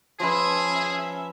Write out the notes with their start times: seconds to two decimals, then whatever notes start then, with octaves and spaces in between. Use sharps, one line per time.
0.20 F3 C#4 G#4 B4 E5